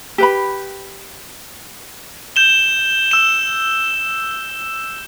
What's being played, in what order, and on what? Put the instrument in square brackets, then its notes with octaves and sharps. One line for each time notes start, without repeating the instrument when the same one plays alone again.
[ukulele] G4 B4 B5
[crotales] G6 E7 G7
E6 E7